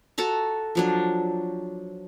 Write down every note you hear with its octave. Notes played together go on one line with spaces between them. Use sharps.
F#4 A4 A5 A#5
F3 F#3 D4